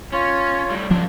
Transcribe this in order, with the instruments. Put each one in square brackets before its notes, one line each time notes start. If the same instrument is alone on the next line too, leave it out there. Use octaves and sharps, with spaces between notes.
[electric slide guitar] C#4 [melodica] F4 C#5
[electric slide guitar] A2 G3
[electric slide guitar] A#2 C#3 D4 [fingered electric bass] F3 F#3